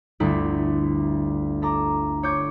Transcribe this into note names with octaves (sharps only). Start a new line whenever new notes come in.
G1 D2 E4
A4 A#5 D6
C#5 D6 G6